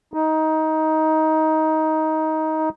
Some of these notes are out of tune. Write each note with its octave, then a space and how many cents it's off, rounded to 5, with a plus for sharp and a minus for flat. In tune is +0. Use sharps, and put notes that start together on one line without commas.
D#4 +15